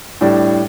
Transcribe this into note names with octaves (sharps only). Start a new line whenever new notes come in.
A2 G3 D4